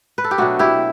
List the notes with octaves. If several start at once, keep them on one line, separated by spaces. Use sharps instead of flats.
B4
A4
G4
B2 F#3 A3 D4 F#4
E4 G4